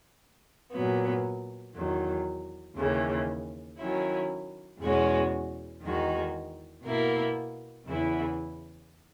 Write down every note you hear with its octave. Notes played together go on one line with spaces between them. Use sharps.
A#2 F#3 B3
E2 D#3 F#3
D#2 C#3 E3
D#3 F#3 C#4 E4
E2 B2 G#3 C#4 F#4
E2 D#3 G#3 D#4 F#4
B2 A#3 E4
E2 C#3 E3 B3 E4